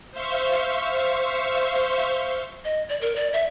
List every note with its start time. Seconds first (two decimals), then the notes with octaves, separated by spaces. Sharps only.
0.11 C5 E5 F5 C6 C#6
2.64 D#5
2.89 D5
3.01 A#4
3.16 D5
3.33 E5